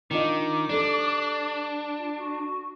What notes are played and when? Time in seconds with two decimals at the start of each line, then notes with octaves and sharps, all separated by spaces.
0.11 D#3 D4 F4 D#5 D6
0.70 G3 D4 A4 C5
1.97 F4
2.16 F#4